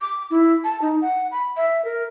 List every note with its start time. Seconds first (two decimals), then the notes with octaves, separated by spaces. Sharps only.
0.01 D6
0.31 E4
0.64 A5
0.82 D#4
1.02 F#5
1.32 B5
1.57 E5
1.85 A#4